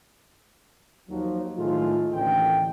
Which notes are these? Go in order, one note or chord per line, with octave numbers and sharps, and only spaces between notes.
D#2 F3 F#3
A2 D#3 G#3 A3 F4
A1 D#2 D3 G5